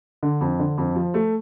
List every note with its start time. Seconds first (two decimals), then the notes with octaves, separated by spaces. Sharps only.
0.23 D3
0.41 F2
0.59 D3
0.78 F2
0.95 F3
1.14 A3